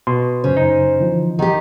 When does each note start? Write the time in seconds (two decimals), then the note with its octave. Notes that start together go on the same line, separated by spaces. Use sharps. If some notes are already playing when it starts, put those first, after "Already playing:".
0.07 B2 C6
0.44 F#2 C#3 C#4 C5
0.57 D#4
0.98 D3 E3 F3
1.39 D#3 G4 D#5